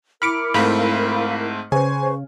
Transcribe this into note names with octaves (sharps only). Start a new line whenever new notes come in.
E4 A#4 B5 D6 F6 C#7 D7
G#2 A3 C4 F5 B5
C#3 B4 C5 G#5 C#6